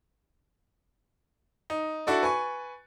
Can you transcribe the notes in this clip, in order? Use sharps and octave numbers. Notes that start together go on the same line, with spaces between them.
D#4
D4 E4 F#4 A4 D5
B4 G#5 C#6